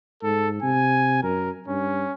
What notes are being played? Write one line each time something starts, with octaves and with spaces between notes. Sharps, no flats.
G#2 A4
C3 G#5
F#2 A#4
G2 C#4